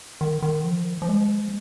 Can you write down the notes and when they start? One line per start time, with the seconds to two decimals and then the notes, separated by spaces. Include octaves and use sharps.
0.21 D#3
0.42 D#3
0.65 F3
1.02 F3
1.09 G#3